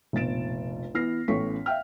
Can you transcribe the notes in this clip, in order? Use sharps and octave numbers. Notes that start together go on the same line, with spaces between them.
F1 A#1 B2 A6 D7 E7
E3 B3 F6 A#6 C7
A1 A2 B3 C#4 C#6 B6
E5 F5 G5 F6